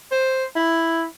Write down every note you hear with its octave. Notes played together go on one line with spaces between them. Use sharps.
C5
E4